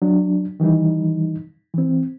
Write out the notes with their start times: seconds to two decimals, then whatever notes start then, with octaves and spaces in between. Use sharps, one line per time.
0.02 F#3 D4
0.60 D#3 E3 G3 D#4
1.74 E3 C4